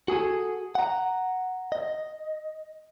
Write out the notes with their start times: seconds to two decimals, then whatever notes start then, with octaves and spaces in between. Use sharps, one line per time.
0.08 F#4 G#4 A4 G#5
0.75 F#5 A#5
1.72 D#5